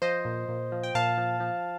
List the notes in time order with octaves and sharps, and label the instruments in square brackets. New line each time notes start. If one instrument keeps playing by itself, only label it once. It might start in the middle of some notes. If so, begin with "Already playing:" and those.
[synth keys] F3 C5 D#5
A#2
A#2
F3
G5
A#2 F5 A5
F3
F3